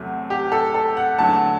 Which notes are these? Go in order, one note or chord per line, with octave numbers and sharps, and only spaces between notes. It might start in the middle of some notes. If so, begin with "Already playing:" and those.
Already playing: E2 C3 F#3 A3
G4
A4
A4
F#5
E2 D3 F#3 A3 A5